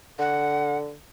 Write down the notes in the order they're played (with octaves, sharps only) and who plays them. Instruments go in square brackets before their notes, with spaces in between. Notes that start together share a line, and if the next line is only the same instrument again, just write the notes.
[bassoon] D3 [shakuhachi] F#5